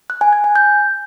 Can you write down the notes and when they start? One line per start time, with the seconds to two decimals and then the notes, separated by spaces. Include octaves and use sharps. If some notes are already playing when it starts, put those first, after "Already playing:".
0.10 F#6
0.21 G#5
0.33 G#6
0.44 G#5
0.56 G6